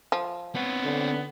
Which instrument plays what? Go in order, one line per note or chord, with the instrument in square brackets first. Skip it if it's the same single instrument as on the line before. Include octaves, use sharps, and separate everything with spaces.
[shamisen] F3
[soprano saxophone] B3 [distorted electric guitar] C4 C#5
[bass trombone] D3